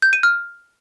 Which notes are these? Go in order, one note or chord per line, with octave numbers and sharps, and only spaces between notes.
G6
D#7
F6